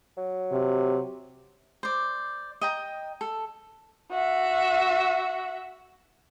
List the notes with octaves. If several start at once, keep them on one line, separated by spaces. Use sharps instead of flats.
F#3
C3
C5 D5
D#5 G5 A#5
A4
F#4 E5